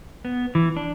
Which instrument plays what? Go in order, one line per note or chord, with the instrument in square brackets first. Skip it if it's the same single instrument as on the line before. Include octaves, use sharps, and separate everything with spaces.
[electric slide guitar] B3
E3
D4